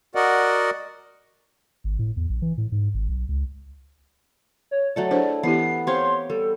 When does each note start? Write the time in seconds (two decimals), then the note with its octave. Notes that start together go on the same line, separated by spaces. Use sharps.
0.15 F#4 A#4 D5 D#5 F#5
1.84 G#1
1.99 A2
2.17 E2
2.29 A#1
2.42 E3
2.58 A2
2.72 G#2
2.94 G#1
3.09 B1
3.29 C#2
4.71 C#5
4.96 F#3 A3 A4 D5
5.11 D4 E4 G#4 C5
5.43 E3 B3 E4 G4 C7
5.87 C4 G4 C5 C#5 F5 C6
6.30 G3 A4